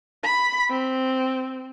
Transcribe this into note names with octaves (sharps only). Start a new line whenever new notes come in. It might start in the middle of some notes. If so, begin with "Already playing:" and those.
B5
C4